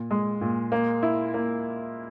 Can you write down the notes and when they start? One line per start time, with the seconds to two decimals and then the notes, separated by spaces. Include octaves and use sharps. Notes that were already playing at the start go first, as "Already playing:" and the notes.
Already playing: A#2
0.11 G#3
0.41 A#2
0.72 A#3
1.03 E4
1.34 A#3